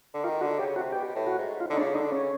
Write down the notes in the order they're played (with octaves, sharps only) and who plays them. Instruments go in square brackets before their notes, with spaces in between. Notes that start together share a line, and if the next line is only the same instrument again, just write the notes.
[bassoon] D3
[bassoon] D#3 [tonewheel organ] F4
[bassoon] D3 [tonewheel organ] F#4
[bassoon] C#3 [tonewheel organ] G4
[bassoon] C3 [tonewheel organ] F#4
[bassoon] B2 [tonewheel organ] G4
[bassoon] A2
[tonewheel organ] F#4
[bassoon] G#2
[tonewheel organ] F4
[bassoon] D3 [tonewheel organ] D#4
[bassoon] C#3 [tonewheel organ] D4
[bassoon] D3 [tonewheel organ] D#4
[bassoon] C#3 [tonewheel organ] C#4